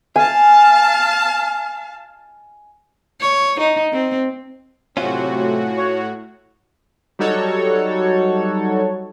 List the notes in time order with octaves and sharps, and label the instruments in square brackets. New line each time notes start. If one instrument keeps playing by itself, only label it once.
[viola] F5 A5 [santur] G#5
[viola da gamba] C#5
D#4
C4
[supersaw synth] A2 F#4 [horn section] C3 F#3 C4 [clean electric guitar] C#4 F4
[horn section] C#5
[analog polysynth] F#3 G3 D#4 F#4 A4 C#5